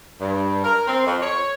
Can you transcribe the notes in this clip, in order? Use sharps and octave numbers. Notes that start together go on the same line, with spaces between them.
G2
A#4
C4
F2
C#5